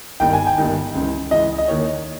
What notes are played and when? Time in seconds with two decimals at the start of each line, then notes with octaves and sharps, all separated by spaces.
0.20 G1 G2 D#3 G5
0.33 G#5
0.47 G5
0.58 G1 G2 D#3
0.94 C#2 C#3 E3
1.31 C#2 C#3 E3 D#5
1.58 D#5
1.68 D#2 D#3 C#5